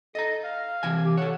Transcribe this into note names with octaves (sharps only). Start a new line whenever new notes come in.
A4 D#5 A#5
F5
C3 E3 G#5
G4
A4 C#5 F#5